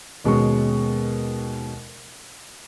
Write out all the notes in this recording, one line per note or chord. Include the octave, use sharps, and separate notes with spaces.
D#2 B2 G#3 C#4 C#6